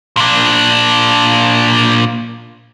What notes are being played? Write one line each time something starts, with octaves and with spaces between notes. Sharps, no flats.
A#2 D4